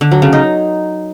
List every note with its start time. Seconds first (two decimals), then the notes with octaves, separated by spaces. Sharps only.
0.01 D3
0.12 F#3
0.22 C#3
0.33 D#4